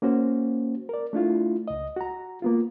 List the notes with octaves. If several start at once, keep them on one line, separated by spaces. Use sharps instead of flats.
A#3 C#4 F#4 C5
A#4 D5
A3 D4 E4 F4
C#2 D#5
F#4 A#5
A#3 B3 F4